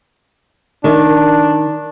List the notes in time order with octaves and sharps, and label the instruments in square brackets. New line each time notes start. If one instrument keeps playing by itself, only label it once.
[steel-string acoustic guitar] D#3 [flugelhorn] D4